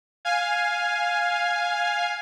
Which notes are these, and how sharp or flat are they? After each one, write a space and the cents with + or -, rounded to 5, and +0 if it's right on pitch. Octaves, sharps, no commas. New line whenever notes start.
F5 +5 G#5 +0